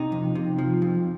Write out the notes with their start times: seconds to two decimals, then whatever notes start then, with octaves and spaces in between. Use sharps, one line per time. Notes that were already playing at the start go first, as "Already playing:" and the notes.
Already playing: C3 D#4
0.12 F2
0.35 C3
0.58 F3
0.82 F2